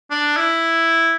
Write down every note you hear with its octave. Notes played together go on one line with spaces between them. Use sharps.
D4
E4